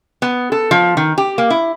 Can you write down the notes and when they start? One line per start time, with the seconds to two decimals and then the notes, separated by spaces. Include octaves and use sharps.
0.22 B3
0.52 A4
0.71 F3
0.97 D#3
1.18 G4
1.38 A#3
1.50 E4